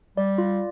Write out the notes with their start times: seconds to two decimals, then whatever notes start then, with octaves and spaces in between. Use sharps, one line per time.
0.17 G3 D5
0.38 F4